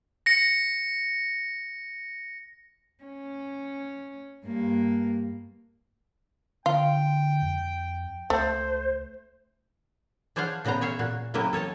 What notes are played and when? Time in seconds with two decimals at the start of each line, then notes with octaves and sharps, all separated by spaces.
0.26 A#6 C#7
3.04 C#4
4.46 G2 A#3
6.66 D3 F4 G5
7.42 F2
8.30 C#2 A3 C5
10.36 D4 G#4 C5 C#5 F5 F#5
10.65 A#2 C#3 B3 C5 A#5
10.81 G#4 C#5 E5 F5
10.99 A#2 F#4
11.34 C#3 F#3 A#3 C4 E4 D#5
11.53 A4 C#5 D#5 A5